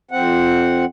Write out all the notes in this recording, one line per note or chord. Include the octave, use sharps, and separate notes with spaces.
F2 C4 F#5